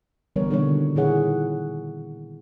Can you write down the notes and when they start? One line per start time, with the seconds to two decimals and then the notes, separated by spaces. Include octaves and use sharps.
0.36 D3 E3 G3 B3 A#4 C#5
0.50 B2 D3 D#3 G3 A#3 C#5
0.95 A#2 D#3 E4 G#4 C#5 F#5